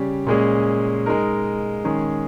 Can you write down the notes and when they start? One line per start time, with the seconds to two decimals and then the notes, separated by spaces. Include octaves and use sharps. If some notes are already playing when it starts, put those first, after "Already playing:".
Already playing: C#3 G3 C#4 G4
0.27 A#2 G#3 C#4 G#4
1.06 G#3 D#4 A#4
1.85 D#3 G#3 C#4 G#4